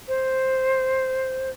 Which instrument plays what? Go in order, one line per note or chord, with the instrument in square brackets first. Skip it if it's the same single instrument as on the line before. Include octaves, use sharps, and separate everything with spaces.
[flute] C5